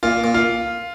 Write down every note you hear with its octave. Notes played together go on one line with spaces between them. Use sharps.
A#2 F4
A#2
F4